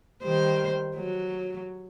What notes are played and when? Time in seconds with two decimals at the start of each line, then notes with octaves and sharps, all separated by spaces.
0.23 D#3 G3 C5
0.96 F#3